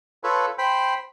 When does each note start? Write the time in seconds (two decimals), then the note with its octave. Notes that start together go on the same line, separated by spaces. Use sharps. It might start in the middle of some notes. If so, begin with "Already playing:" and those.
0.24 F4 A4 B4 C#5
0.58 C5 G5 B5